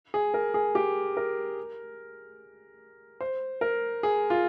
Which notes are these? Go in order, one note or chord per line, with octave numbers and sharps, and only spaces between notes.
G#4
A#4
G#4
G4
A#4
C5
A#4
G#4
F4